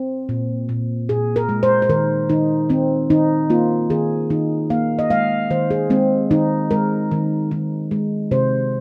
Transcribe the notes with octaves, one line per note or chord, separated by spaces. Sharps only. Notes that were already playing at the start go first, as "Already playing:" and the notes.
Already playing: C4
A#2
A#2
A#2 G#4
A#4
G#3
C5
C5
D#3 A#4
D#3 D#4
D#3 C4
D#3 D#4
A#3 F4
D#3 G#4
D#3 D#4
A#3 F5
D#5
G#3 F5
D#3 C5
G#4
G#3 C4
D#3 D#4
G#3 A#4
D#3
D#3
G#3
C3 C5